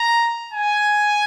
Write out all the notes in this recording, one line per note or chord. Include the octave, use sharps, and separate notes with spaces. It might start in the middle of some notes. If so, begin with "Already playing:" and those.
Already playing: A#5
G#5